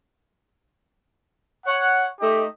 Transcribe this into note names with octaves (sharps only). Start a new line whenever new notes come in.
C#5 F#5
A3 D#4 G4 D#5